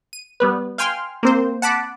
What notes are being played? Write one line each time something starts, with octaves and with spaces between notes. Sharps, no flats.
D#7
G3 B3 B4
F5 G5 G#5 C6 F6
A#3 C4 C5
F#5 A5 B5 D6